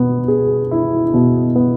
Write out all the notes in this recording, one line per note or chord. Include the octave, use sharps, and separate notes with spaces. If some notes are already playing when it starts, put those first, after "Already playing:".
Already playing: B2 B3
G#4
E4
B2
B3